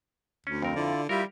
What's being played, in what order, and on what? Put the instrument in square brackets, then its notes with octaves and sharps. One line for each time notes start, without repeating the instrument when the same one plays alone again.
[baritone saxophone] D2 [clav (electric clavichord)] C#4
[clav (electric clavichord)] F2 A#4 [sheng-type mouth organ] C4
[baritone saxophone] D3 [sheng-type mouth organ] E4 F4 D5
[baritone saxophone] G3 [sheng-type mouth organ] E4 F4 E5 [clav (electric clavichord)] G4 A#4